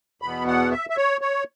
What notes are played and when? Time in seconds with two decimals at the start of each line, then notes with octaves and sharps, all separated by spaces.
0.22 E2 B2 B3 B5
0.47 F#5
0.72 E5
0.90 E5
0.97 C#5
1.21 C#5